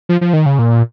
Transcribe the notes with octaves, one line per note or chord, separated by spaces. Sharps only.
F3
F3
D#3
C#3
A#2